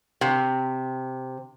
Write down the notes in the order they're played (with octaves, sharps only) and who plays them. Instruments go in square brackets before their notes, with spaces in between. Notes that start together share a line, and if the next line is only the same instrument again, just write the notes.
[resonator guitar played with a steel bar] C3